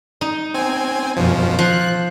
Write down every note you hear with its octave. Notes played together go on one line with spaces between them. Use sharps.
D#4
C4 G#5
F#2 B2 F3
F3 F#6